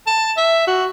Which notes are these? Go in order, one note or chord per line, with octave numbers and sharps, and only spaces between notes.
A5
E5
F#4